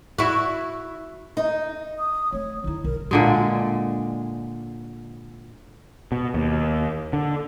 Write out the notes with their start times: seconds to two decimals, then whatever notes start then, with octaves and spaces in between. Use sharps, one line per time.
0.18 E4 F#4
1.37 D#4
1.99 D#6
2.32 A3 C4 C#5
2.64 D#3 D#4 E4
2.84 B1 E2 A#4
3.11 A#2 D3 G#3
6.12 B2
6.34 D#2
7.13 D3